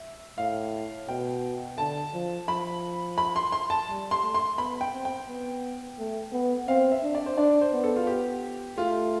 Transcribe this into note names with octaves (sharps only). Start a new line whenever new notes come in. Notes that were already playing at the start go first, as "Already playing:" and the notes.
Already playing: E5
A2 F5
B2 G5
D3 A5
F3
F3 B5
B5
C6
C6
A5
G3
C6
A3
C6
B3 B5
G5
C4
G5
B3
A3
B3
C4 F5
E5
D4
D5
C5
D4 D5
C5
B3
A4
F4
G4
A3 F4